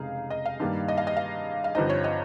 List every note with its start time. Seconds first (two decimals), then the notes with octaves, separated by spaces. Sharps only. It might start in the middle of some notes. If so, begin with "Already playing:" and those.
Already playing: F1 C#3 G#3 D#4 G#4 F5
0.30 D#5
0.45 F5
0.60 G2 D#3 G3 A#3
0.88 D#5
0.97 F5
1.07 D#5
1.17 F5
1.64 F5
1.75 G1 G2 F3 C4 D#4 D#5
1.89 C#5
2.04 D#5